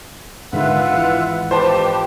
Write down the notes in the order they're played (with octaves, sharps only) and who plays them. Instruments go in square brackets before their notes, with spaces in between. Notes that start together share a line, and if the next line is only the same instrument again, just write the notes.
[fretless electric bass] G#2 D3 D#3 [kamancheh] F4 F#5 [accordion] B4 E5
[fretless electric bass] G#1 E3
[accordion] F2 G4 [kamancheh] B4 [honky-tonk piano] C5 A5